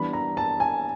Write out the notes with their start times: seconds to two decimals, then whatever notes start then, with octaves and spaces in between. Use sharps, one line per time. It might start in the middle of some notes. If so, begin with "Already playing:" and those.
Already playing: E3 G3 B3 D4 B5
0.13 A#5
0.37 A5
0.60 G#5